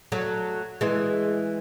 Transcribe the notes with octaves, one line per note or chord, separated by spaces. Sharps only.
F#3 A3
E3 G#3